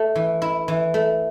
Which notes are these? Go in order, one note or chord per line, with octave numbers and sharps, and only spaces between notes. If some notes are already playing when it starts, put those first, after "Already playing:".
Already playing: A3
E3
E4
E3
A3